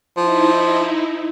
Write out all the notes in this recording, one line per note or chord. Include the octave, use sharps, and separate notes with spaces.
F3 D#4 E4